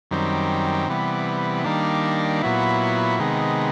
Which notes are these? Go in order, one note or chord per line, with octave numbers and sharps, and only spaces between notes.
F#2 D#3 G3 C4
C3 E3 G3 B3
D#3 G3 A#3 D4
A#2 F#3 B3 E4
C3 D#3 G#3 B3